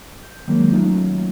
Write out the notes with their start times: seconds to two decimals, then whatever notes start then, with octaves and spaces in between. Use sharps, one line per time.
0.23 G6
0.48 D#3 F#3 G#3 A#3
0.72 F#3 A3 C#4 D#4 F4